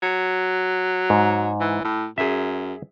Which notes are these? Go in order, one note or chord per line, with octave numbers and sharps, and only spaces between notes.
F#3
G#2
E3
A2
F#2 G#4 E5